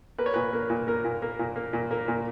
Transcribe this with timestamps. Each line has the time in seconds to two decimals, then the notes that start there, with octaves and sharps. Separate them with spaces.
0.18 A#3 B4
0.26 C#5
0.34 A#2 B4
0.53 A#3
0.70 A#2
0.87 A#3 A#4
1.04 A#2
1.22 A#3
1.39 A#2
1.56 A#3
1.73 A#2
1.91 A#3
2.08 A#2